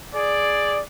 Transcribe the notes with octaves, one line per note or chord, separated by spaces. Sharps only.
G#4 D5